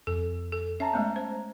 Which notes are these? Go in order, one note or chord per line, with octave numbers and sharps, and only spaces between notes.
F2 A4
A4
C#4 E5 A5 A#5
G#3 A3 B3
C5